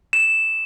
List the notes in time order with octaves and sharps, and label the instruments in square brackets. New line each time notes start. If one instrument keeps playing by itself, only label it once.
[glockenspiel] E7